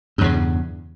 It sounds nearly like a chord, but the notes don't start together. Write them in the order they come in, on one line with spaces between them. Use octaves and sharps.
G2 E2 C#3